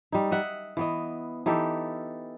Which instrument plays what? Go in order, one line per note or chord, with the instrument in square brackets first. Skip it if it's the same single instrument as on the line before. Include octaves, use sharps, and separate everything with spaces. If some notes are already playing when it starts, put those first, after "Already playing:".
[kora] G3 D#4
D#5 E5 F#5
E3 B3 D#5
E3 D#4 G4 A4